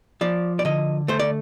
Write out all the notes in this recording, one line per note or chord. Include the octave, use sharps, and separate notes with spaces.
F3 D5
D5
D3 D#5
A3 C5
D5